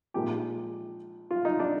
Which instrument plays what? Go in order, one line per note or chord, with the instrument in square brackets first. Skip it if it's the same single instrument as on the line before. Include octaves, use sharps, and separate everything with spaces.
[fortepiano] A#1 G#2 F3 G#3 G4
F4
D#4
D4